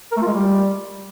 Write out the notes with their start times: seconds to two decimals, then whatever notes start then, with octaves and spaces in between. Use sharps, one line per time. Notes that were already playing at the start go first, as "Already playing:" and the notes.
0.12 A#4
0.17 A3
0.22 F4
0.27 G#3
0.32 G3